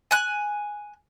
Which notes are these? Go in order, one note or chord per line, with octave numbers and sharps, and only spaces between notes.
G#5 F#6